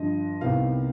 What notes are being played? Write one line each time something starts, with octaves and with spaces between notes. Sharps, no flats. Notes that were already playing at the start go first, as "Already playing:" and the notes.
Already playing: G2 D3 F3 D#5
C2 C3 D#3 B3 D#4 F5